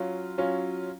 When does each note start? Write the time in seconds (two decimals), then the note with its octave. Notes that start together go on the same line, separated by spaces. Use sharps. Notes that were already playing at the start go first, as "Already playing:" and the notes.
Already playing: F#3 C#4 F4
0.38 F#3 C#4 F4